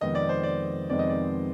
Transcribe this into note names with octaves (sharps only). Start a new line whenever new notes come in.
F2 C3 D#3 G#3 B3 D#5
D5
C5
D5
F2 C3 D#3 G#3 B3 D5
D#5
D5